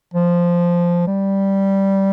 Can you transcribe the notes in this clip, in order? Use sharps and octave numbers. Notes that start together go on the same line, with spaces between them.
F3
G3